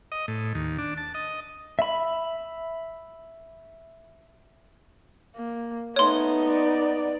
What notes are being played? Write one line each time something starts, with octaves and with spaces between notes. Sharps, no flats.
D#5
A2
D#2
D4
A5
D#5
E5 B5
A#3
A3 B3 D#4 C#5 C6
D5